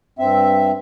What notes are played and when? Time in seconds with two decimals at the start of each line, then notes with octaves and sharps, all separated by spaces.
0.19 G2 C4 E5